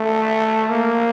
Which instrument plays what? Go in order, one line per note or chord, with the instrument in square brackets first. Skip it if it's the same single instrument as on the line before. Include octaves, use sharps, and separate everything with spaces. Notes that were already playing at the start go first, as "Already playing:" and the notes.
Already playing: [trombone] A3
A#3